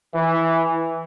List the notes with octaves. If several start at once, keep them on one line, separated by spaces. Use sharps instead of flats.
E3